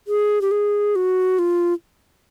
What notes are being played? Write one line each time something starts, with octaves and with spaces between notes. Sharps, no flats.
G#4
G4
G#4
F#4
F4